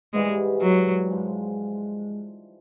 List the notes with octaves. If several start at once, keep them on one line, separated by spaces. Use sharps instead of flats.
G#2 E3 G3 G#3
F#3
G#2 F3 G#3